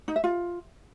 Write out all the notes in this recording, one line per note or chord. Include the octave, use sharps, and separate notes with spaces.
D#4
E5
F4